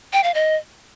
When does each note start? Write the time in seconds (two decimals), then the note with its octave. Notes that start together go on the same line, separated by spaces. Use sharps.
0.13 G5
0.24 F5
0.34 D#5